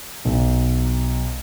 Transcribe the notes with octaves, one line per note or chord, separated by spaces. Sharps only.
B1